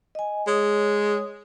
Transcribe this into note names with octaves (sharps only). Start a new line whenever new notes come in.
D#5 G#5
G#3 C#5 D#6